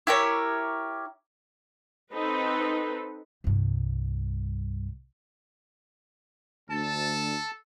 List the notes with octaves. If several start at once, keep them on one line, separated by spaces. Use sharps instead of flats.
E4 G4 A#4 C#5
C4 D#4 A4 B4
C2 G2
D2 A4 A5